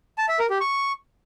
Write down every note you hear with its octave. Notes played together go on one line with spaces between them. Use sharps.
A5
E5
A#4
G4
C#6